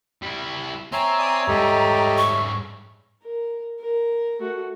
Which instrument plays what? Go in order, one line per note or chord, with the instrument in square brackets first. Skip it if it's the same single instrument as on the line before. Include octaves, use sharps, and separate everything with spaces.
[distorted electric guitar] G3 E4
[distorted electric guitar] C4 [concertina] C#5 E5 [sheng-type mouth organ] G#5 [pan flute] A#5
[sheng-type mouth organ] D5 G#5 D#6
[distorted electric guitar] G#2 G3 [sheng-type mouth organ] G4 A4 D#5
[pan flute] C#6
[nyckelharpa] A#4
A#4
A3 F#4